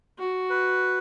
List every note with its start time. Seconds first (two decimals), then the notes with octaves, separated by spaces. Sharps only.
0.19 F#4
0.50 B4